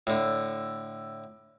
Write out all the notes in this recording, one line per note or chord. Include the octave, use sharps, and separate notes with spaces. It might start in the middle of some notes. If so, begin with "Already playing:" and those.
A2 D3